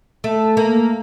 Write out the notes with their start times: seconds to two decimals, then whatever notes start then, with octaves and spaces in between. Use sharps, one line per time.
0.24 A3
0.57 A#3